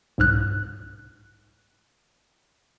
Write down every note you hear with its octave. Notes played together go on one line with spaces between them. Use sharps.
C2 G#2 F6 F#6